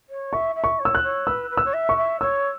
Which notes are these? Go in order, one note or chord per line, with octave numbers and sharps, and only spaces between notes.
C#5
E5 C#6
E5
C#6
C#5
E6
F#6
C#5
B4 E6
B4
E6
C#5
E5
C#6
E5
C#5 E6